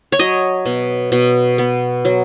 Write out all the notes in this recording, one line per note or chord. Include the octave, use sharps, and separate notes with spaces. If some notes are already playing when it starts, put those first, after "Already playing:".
C#5
F#3 D#5
B2
B2
B3
F#3